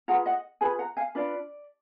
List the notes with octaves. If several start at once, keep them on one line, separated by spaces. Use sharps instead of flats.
F4 G#4 B4 F#5 A#5
D#5 F#5
F4 G#4 B4 G#5 B5
F#5 A#5
F5 G#5
D4 F4 B4 D5